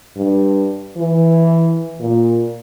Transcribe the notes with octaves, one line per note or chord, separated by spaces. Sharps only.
G2
E3
A#2